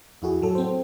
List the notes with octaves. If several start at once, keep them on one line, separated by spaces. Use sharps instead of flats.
F2 E4 F#4 G#4
A2 F#3 A4
C4 C5